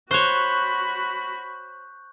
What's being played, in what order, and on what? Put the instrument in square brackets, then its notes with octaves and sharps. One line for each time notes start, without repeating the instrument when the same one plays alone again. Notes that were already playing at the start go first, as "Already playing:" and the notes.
[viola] F#4 B5 [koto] C5 C#5 [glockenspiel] C#6 F#6 G6